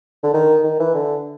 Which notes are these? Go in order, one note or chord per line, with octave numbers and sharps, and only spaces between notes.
D3
D#3
D#3
E3
D3